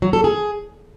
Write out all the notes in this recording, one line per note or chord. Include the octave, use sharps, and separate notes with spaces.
F#3
A4
G#4